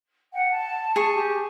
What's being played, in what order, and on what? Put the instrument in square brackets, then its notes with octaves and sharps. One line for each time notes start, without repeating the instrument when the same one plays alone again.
[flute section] F#5 G5
A5
[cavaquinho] G#4 C#6
[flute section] G4